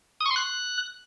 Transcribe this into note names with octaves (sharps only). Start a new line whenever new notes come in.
D#6
C#6
C6
F#6